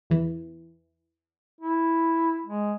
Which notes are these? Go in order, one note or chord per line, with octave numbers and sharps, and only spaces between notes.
E2 E3
E4
G#3